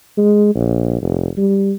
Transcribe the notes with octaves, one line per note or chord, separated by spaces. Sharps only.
G#3
A#1
F1
G3